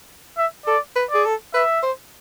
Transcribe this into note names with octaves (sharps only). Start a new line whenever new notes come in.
E5
A4 D5
B4
G#4 D5
A4
B4 E5
C5